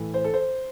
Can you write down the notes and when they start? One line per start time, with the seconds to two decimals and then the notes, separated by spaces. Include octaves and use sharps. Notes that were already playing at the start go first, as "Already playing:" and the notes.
Already playing: A2 E3
0.14 C5
0.24 A4
0.34 C5